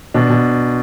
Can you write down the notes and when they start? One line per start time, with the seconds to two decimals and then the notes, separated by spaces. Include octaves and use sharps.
0.14 B2 D4
0.30 B2